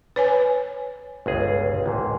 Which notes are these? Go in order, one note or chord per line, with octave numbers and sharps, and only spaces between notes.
B4 C#5 G#5
G1 C#2 G#4
A1 D#2 G#2